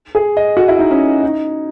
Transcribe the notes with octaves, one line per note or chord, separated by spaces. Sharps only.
G#4
D#5
F#4
E4
D#4
C#4
D#4